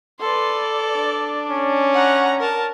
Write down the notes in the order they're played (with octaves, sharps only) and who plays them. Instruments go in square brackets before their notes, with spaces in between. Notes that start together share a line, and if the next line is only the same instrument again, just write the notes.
[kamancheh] A4 D5 [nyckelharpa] B4 C6
[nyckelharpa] D4
[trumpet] C#4
[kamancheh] F#5 A#5
A#4 A5